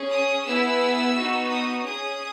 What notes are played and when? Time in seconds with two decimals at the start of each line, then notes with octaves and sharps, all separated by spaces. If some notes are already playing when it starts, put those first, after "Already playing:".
Already playing: C#4 G#4
0.11 D#6
0.45 B3 E4 G#4 E6
1.16 B3 D#4 F#4
1.50 D#6
1.84 C#4 G#4 D#6